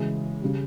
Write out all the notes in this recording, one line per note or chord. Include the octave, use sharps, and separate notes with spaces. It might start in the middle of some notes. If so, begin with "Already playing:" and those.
Already playing: C#3 E3 G#3
C#3 G3